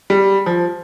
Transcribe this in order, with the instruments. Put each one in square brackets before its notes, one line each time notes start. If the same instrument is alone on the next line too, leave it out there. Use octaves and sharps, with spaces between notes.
[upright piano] G3
F3